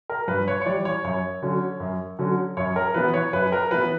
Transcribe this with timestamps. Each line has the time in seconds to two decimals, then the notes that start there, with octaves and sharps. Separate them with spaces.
0.10 A#4
0.28 G2 B4
0.48 C#5
0.61 C#5
0.66 E3 G3 D5
0.85 C#5
1.04 F#2 C#5
1.42 D3 F#3 C#4
1.80 F#2
2.19 D3 F#3 C#4
2.57 F#2 C#5
2.76 A#4
2.94 E3 B3 B4
3.14 C#5
3.33 F#2 B4
3.52 A#4
3.71 E3 B3 B4